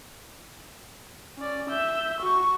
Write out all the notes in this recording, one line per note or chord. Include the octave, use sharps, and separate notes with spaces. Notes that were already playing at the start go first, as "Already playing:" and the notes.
C#4 D5
E5 G6
F#4 C#6